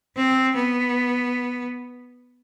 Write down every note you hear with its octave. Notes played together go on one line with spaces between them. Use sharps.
C4
B3